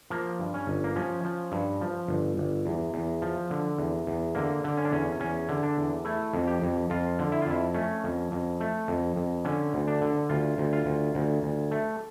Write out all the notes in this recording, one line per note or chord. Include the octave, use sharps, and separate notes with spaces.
F3 A#3
G2
C#4
G1
A#3
F3 C#4
F3
G2
F3
G1
G1
E2
E2
F3
D3
E2
E2
D3 A#3
D3
C#4
D4
E2 C#4
E2 C#4
D3
D4
E2
A3 E4
F2
G4
F2
F2 F4
D3
E4
F4
F2 E4
A3 C#4
F2
F2
A3
F2
F2
D3 C#4
D2
D4
D3
D2 F4
D2
F4
D2
D2
D2
A3